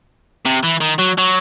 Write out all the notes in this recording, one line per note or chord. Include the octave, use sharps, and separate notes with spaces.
C3
E3
D#3
F#3
F#3